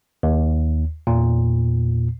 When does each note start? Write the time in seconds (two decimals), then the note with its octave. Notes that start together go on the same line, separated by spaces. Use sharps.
0.23 D#2
1.07 E2 A#2